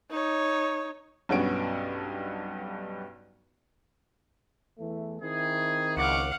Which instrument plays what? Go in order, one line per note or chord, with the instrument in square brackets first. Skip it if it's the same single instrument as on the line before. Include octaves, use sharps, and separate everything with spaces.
[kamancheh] D#4 C#5
[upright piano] B1 G2 B3 C#4 F#4 D7
[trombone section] E2 E3 A3
[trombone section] D#3 C4 E4 [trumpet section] G#4
[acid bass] C#2 [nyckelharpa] F5 F#5 [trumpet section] C#6 D6